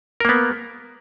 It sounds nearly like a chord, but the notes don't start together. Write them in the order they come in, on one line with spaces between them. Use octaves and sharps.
A#4 A#3 B3